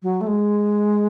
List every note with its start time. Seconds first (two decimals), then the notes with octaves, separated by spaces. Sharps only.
0.03 F#3
0.21 A3
0.27 G#3